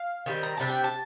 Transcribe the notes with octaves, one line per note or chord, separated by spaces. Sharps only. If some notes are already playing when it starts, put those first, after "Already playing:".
Already playing: F5
D#3 G3 C4
A#5
C3 G3 D4 A5
G5
A5